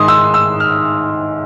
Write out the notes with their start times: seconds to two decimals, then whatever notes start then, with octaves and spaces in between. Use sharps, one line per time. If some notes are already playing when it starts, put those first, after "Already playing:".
Already playing: G#2 D#3 G#3 C6 D#6
0.08 E6
0.34 E6
0.60 F6